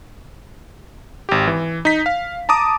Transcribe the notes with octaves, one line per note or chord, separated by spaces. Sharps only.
G#1 G4
E3
D#4 B6
F5
A5 A#5 D6 D#6